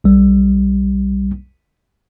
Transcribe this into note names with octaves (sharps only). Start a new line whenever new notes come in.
B1 G3